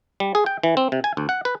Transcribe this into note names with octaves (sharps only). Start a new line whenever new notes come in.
G3
G#4
G5
E3
C4
C3
G#5
D2
F#5
B4